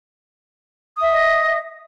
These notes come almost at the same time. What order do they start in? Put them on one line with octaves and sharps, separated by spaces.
D#6 E5 F#5 D#5